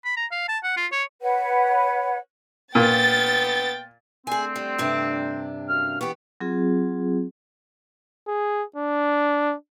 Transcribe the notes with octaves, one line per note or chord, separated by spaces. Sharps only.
B5
A#5
F5
A5
F#5
F4
C#5
B4 C#5 F#5
A#2 B3 G5 A6
D3 A3 C4 G#4 G#5
G3
G2 C3 D4
F#2 F5 F6
E3 B3 G4 C#6
F#3 C4 F4 G#4
G#4
D4